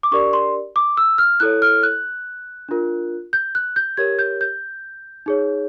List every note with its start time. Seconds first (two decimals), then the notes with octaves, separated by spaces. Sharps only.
0.03 D6
0.11 D4 G4 A#4 D5 C#6
0.33 C6
0.76 D6
0.97 E6
1.18 F6
1.40 E4 A4 C#5 F#6
1.62 F6
1.83 F#6
2.69 D4 F4 A#4
3.33 G6
3.55 F#6
3.76 G6
3.97 G4 A#4 C#5 G#6
4.19 G6
4.41 G6
5.26 D#4 G#4 C#5